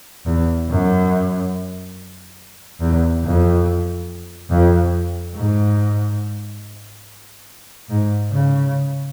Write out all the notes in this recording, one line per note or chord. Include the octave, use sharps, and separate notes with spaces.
E2
F#2
E2
F2
F2
G#2
G#2
C#3